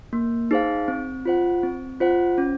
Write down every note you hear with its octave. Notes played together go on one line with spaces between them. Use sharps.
A#3
D#4 G#4 C5 F5
C4
F4 C5 F#5
C4
F4 C5 F#5
C#4